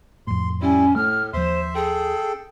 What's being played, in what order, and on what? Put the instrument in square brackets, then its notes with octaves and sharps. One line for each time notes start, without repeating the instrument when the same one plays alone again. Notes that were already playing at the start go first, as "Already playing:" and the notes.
[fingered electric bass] F2 A2 [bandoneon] C6
[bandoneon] G3 E4 [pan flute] C#4
[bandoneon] A2 [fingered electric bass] A3 [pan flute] F6
[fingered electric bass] D#2 F3 [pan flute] C5 [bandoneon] E5 C6
[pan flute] G#4 [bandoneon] A4 G5